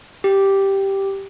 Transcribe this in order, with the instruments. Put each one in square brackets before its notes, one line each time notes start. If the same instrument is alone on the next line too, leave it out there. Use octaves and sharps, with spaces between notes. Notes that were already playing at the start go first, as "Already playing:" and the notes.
[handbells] G4